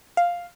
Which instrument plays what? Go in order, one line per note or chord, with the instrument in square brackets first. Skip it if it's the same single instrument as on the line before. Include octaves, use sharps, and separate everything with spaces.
[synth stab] F5